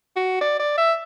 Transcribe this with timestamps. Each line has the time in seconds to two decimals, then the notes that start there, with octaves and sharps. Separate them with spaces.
0.16 F#4
0.41 D5
0.60 D5
0.78 E5